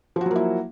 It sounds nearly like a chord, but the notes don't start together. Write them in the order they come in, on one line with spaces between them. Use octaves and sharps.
F3 F#4 F#3 A#3 E4